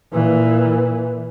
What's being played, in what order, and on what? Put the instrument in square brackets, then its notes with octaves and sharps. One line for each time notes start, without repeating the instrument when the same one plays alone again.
[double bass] A#2 E3